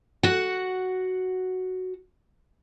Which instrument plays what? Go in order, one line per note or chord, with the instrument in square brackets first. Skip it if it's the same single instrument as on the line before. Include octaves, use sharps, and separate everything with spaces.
[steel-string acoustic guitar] F#4 F#5